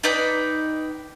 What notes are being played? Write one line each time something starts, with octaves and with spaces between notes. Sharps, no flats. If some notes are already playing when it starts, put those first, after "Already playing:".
D#4 B4 D5 G5